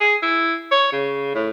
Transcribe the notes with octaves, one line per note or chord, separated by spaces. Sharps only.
G#4
E4
C#5
C#3
A2